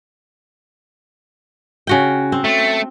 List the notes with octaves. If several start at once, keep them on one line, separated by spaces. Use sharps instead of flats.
C#3 F#4 G5
C4
A3